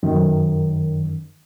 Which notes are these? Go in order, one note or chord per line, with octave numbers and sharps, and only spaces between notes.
F#2 D#3